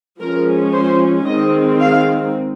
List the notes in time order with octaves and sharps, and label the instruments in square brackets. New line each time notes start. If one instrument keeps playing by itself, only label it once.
[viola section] F3 G#3 C#4 A#4
C5
D#3 G#3 C4 D#5
F5